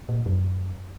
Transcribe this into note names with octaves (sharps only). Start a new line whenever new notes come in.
A#2
F#2